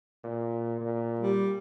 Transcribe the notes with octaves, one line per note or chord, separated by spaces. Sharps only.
A#2
A#2
G3